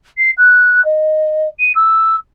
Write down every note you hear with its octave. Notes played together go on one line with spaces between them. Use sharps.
C7
F#6
D#5
D#7
E6